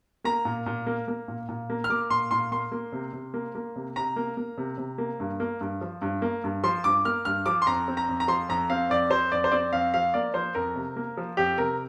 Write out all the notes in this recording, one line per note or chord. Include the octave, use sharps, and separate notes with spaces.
A#3 A#5
A#2
A#2
A#3
A#3
A#2
A#2
A#3
F6
A#3 D6
A#2 C6
A#2 C6
A#3 C6
A#3
C3
C3
A#3
A#3
C3
C3 A#5
A#3
A#3
C3
C3
A#3
G2
A#3
G2
F3
G2
A#3
G2
F3 C6
G2 D6
A#3 F6
G2 F6
F3 D6
C6
F2 A#5
C4
A#5
F2
A#5
F3 C6
F2 A#5
C4 F5
F2 D5
F3 C5
F2 D5
C5
C4 D5
F2 F5
F3 F5
A#3 D5
F3 C5
F2 A#4
C3
A#3
F3
F2 G4
C3 A#4